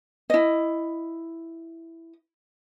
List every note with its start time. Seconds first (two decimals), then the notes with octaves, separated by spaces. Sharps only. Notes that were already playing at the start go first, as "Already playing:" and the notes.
0.30 E4 D#5